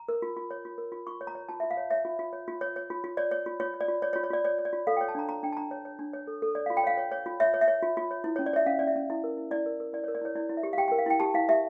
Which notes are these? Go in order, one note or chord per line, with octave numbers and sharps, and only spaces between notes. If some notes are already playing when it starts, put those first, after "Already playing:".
Already playing: A#5
A#4
F4
F4
C#5
F4
A#4
F4
F4 C#6
C#5
A#5
C#5
F4 A5
E5
F4
F5
C#5
C#5 E5
F4
F4
C#5
F4
C#5
C#5
F4
F4
C#5 D5
C#5
F4
F4 C#5
C#5
D5
F4
C#5 D5
C#5
F4
C#5
F4 D5
C#5 D5
C#5
D5
F4
A4 F5
G5
C#5
A5
D4 A#5
D4 A#5
D4 G5
A5
D4 A#5
C#5
C#5
D4
C#5
A4
A4
C#5 D5
F5
F4
G5
C#5 F5
C#5
C#5
F4
C#5 E5
C#5
E5
C#5
F4
F4
C#5
E4
C#4 C#5
D5
C#5 E5
C#4 F5
C#4 D5
E5
C#4
E4
A#4
E4
E4 D5
A#4
A#4
E4 D5
C#5
A#4
D5
E4 C#5
E4 D5
E4
E5
G4
F5
G4 G5
G5
A#4
F5
E4 G5
G4 A5
E4 F5
G4 E5